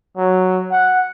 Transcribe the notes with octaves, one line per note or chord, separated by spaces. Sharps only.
F#3
F#5